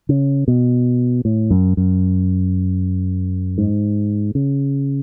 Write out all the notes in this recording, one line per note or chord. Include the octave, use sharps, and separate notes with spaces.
C#3
B2
A2
F#2
F#2
G#2
C#3